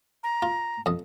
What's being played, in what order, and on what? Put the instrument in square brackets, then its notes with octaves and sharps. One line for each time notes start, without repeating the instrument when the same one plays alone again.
[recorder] A#5
[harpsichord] F4
F2 D#5